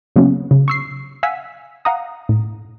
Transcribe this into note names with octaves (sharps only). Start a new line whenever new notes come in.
C#3 F#3 A#3 B3 C#4
C#3
C#6 E6 C7
F5 F#5 G#5 E6 B6
F5 F#5 A#5 D#6
A2